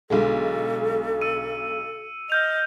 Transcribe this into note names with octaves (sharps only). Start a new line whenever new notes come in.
B1 D3 G#3 A4
E6 C#7 D#7
D#5 F6 G6 F7